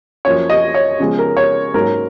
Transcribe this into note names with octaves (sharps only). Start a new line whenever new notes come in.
F#2 F3 A#3 C#4 C#5
D#5
C#5
C#3 F3 G#3 B3
A#4
C#5
G#2 F#3 A#3 C#4 A#4